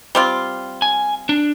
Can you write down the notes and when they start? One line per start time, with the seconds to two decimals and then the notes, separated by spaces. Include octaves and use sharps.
0.15 G3 C4 F4
0.82 G#5
1.29 D4